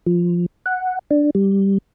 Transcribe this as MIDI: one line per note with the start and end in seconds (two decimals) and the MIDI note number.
0.07 0.46 53
0.66 0.99 78
1.11 1.30 62
1.35 1.78 55